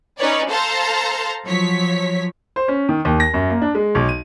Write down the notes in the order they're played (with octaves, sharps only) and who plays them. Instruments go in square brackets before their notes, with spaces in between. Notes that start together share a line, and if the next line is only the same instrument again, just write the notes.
[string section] C#4 D#4 B4 C#5 D5
A4 C5 F5 A5 A#5 C6
F3 F#3 C#5 B6
[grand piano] C5
C#4
D#3
D#2
A#6
F#2
A#3
D4
G#3
B1
D#7